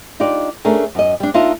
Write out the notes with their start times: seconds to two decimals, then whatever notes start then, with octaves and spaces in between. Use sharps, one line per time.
0.20 D4 D#4 F4 G4 D5
0.65 A3 C#4 D4 G#4 A#4
0.95 F#2 D#5
1.20 G3 D4
1.34 A#3 D4 D#4 F4 D#5 E5